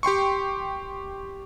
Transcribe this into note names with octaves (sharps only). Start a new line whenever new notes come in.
G4 G5 C6 C#6